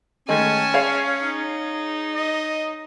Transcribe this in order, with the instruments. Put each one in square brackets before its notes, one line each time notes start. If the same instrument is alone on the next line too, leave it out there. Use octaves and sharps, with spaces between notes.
[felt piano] D#3 G#3 A3 [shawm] C#4 [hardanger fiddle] G#5 A5
[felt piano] G#4 C#5 F5
[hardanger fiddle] D#4
[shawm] D#5